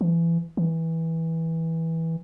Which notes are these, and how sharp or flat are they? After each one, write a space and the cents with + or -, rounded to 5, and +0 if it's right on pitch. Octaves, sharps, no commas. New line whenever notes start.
E3 +25
E3 -15